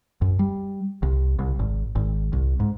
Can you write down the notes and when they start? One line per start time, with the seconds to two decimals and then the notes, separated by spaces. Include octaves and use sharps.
0.22 F#2
0.39 G3
1.03 C2
1.39 C2
1.59 G#1
1.95 G#1
2.33 C2
2.60 G#2